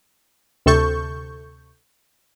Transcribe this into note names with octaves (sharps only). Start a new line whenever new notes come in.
D2 C3 A4 C#6 G6